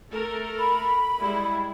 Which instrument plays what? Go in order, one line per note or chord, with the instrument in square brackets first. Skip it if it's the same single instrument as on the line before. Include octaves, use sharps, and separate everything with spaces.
[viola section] A3 A4 A#4
[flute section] B5
[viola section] G3 G#3 E4